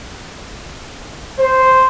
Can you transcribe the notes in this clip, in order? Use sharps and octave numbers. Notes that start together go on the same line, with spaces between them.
C5